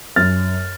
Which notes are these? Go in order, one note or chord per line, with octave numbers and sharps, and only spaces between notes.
F#2 F6 A6